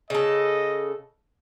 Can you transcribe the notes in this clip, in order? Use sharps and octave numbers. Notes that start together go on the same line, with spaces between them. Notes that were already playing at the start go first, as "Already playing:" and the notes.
C#3 A4 D#5